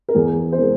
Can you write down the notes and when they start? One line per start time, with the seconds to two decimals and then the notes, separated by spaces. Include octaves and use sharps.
0.09 A#4
0.15 E2 G#4
0.52 C5
0.58 C3 E3 G#3 A#4